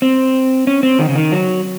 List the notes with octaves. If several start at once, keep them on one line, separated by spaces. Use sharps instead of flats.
C4
C#4
C4
D#3
C#3
D#3
F#3